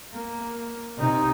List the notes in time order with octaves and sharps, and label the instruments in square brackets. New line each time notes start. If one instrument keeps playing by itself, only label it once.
[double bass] A#3
C3 D#4